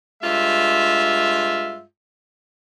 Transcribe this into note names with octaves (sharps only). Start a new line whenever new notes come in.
G2 G#3 F4 E5